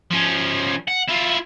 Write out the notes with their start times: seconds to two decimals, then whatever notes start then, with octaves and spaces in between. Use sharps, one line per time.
0.11 F3 C#4
0.88 F#5
1.08 E4 F4